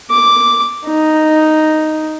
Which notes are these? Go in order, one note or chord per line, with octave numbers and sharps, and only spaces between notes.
D6
D#4